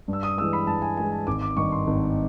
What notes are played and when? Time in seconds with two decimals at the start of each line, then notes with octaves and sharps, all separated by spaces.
0.08 G2
0.13 E6
0.23 D#6
0.37 G#3 E6
0.42 E3
0.53 B5
0.67 G2 A5
0.82 G#5
0.97 E3 G#3 G#5
1.12 A5
1.27 G#1 D6
1.41 D6
1.56 G2 D#3 C#6
1.72 C6
1.87 G#1